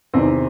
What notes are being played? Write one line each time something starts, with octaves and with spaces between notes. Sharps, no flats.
E2 C3 D#3 C4